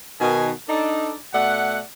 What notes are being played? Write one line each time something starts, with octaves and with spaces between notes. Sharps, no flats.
B2 D#3 G#5
D4 D#4 A4
B2 A3 D5 F#5